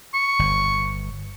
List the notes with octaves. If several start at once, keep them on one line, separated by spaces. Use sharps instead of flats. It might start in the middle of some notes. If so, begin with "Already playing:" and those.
C#6
G1